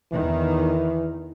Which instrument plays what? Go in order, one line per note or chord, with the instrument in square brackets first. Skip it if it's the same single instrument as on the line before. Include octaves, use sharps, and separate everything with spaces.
[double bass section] E2 D#3 [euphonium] E3